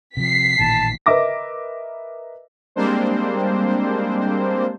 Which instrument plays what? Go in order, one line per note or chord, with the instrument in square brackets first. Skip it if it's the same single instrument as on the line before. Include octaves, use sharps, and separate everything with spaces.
[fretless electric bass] C3 F3 [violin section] B6 C7
[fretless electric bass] A1 A#2 D#3 [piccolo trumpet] A5
[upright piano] A#4 B4 D#5 E5 D6 A#6
[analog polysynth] G3 G#3 A#3 C4 D4 C5